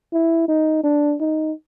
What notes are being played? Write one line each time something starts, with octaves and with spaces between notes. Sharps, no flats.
E4
D#4
D4
D#4